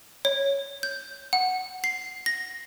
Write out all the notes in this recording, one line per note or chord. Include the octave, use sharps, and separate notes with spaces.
C#5
G6
F#5
C7
A#6